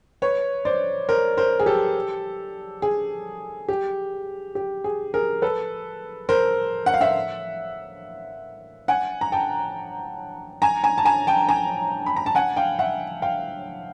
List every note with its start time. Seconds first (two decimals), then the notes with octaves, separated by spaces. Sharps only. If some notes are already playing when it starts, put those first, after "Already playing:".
0.22 B4 C#5
0.65 C5 D5
1.09 A#4 C5
1.37 A#4 C5
1.60 G#4
1.66 G4 A4
2.82 G#4
3.68 G4
4.55 G4
4.84 G#4
5.14 G#4 A#4
5.42 A4 B4
6.29 A#4 C5
6.86 F#5
6.94 F5
7.01 E5 F#5
8.88 F#5 G#5
9.21 A#5
9.32 G5 A5
10.62 G#5 A#5
10.83 G#5 A#5
10.98 A5
11.05 G#5 A#5
11.27 G5 A5
11.49 G#5 A#5
12.06 B5
12.17 A#5
12.26 A5
12.35 F#5 G#5
12.56 F5 G5
12.79 E5 F#5
13.22 F5 G5